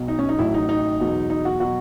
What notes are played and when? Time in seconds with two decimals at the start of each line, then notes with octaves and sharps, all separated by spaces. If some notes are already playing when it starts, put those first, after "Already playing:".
Already playing: B1 B2 F#3
0.08 D#4
0.19 C#4
0.29 D#4
0.38 A1 A2 F#3 E4
0.54 D#4
0.69 D#4
1.00 E2 B2 F#3
1.30 D#4
1.45 F#4
1.60 B2 F#3 F#4